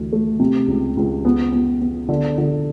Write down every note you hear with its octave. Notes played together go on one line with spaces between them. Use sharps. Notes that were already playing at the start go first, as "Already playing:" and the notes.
Already playing: D2 E3
A3
C3
C#2
C#2
B3
B3
B3
D3
D3